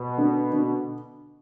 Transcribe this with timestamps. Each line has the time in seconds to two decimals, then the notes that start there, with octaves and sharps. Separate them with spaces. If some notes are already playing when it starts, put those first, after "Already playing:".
Already playing: B2
0.18 D3
0.53 D3